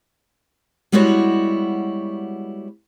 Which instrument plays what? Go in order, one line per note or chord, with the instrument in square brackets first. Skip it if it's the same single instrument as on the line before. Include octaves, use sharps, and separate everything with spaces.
[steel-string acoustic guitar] G3 G#3 B3 E4 F#4 C#5